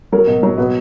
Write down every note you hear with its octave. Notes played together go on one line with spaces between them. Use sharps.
F#3 A#4
B2
F#3
B2 B4